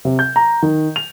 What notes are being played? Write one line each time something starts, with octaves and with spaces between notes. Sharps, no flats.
C3
G6
A#5
D#3
F7